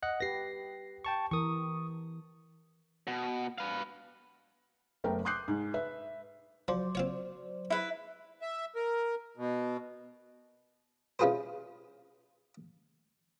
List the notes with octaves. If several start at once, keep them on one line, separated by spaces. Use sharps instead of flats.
D#5 F#5 F#6
G4 B4 A#6 C7
G5 A5 C#6
E3 A#4 C#6 D#6
B2
B4 F5
F#1 A3 B3 A#4 G5
C6 D6 D#6 F#6 G6 C7
G#2
B4 E5
F3 F#3 C5 D5
C4 F4 C#5
E4 B4
E5
A#4
B2
C#4 E4 F4 G#4 B4 C5